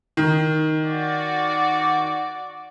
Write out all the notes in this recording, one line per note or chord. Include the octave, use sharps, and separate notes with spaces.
D#3
F#4 D5